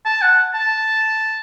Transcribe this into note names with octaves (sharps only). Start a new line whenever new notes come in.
A5
F#5
A5